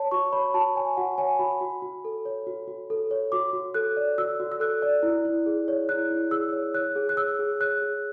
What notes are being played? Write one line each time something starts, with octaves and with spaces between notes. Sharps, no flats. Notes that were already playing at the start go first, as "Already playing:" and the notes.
Already playing: C#5 A5
F#4 C#6
C#5 B5
F#4 A5
C#5 G#5
F#4 F#5
C#5 G#5
F#4 B5
F#4
F#4
A4
C#5
F#4
F#4
A4
C#5
F#4 D6
F#4
A4 F#6
D5
F#4 E6
F#4
E6
A4 F#6
D5
E4
E4
G#4
C#5
E4 F#6
E4
G#4 E6
C#5
C#5 F#6
G#4
F#6
C#5 E6
G#4
C#5 F#6
G#4